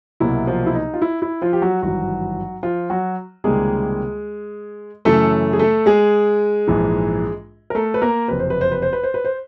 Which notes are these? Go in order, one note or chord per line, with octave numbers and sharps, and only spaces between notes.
C2 B2 F#3 A#3 E4
F3 F4
E4
D#4
F4
E4
E4
F3 F4
G4
F#3 F#4
G#1 G2 E3 F#3 F#4
F3 F4
F#3 F#4
C#2 C3 D#3 G3 G#3 A#3 G#4
F#2 C#3 E3 A3 A4
G#4
A3 A4
G#3 G#4
A#1 G#2 E3
A#4
A3 A4
B4
A#3 A#4
F#1 F2 C3 B4
C5
B4
C5
B4
C5
B4
C5
B4
C5